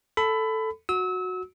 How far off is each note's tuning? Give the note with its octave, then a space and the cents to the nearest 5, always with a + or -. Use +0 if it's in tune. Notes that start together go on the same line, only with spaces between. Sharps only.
A4 +0 B5 +20
F#4 -10 E6 -35